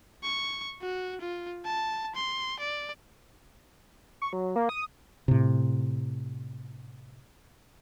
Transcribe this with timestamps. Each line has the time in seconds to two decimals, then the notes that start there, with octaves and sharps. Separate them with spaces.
0.24 C#6
0.82 F#4
1.21 F4
1.65 A5
2.15 C6
2.60 D5
4.22 C#6
4.33 F#3
4.56 A#3
4.69 D#6
5.28 A2 C3